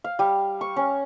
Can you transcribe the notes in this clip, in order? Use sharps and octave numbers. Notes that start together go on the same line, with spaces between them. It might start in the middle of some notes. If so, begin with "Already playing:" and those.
F5
G3
C#6
C#4